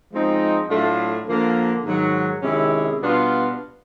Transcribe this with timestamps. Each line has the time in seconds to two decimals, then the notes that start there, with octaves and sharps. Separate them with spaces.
0.11 F3 G#3 C4 D#4
0.68 A2 F#3 A3 D4 F4
1.27 D3 F3 A#3
1.84 G#2 D#3 F#3
2.42 C3 D#3 G#3 C#4 E4
2.99 B2 G3 B3 D4 F4